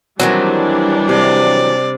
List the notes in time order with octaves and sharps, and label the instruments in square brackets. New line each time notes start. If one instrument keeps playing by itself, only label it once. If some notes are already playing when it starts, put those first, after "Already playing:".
[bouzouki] D#3 E3 F#3 [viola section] G3 D4 [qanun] C4
[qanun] C3 [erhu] D5